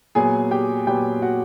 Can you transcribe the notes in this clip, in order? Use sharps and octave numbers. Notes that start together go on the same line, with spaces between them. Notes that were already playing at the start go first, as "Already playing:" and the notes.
A#2 F#3 B3 G#4 G#5
G4 G5
A#2 F#3 B3 G4 G5
F#4 F#5